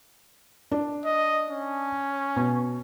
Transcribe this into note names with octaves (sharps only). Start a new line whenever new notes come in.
D4
D#5
C#4
B2